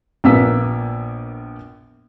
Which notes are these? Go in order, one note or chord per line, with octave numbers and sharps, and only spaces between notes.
A#1 A#3 B3 E6 B6